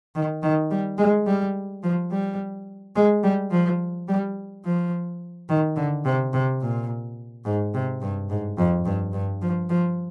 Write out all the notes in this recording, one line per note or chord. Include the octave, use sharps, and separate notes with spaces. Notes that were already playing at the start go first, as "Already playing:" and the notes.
D#3
D#3
G3
G#3
G3
F3
G3
G#3
G3
F3
G3
F3
D#3
D3
C3
C3
A#2
G#2
C3
G2
G#2
F2
G2
G2
F3
F3